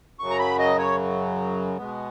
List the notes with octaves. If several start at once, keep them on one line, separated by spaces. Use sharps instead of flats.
F#2 C#3 F#3 C#6
A#5
B5
D#5
C#5
B2 G#3 B3